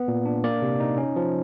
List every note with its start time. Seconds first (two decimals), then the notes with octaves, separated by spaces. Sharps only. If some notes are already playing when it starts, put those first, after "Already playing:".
Already playing: B3
0.08 A#2
0.25 D4
0.44 A#3 D5
0.62 C3
0.80 D#4
0.98 C#4
1.16 F3